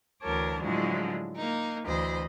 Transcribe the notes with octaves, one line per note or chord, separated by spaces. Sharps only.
D2 E3 A#4 C#5 A5 D6
A2 D3 F3 F#3 G#3 E4
A#3 D#4
D2 E3 C5 D#5 B5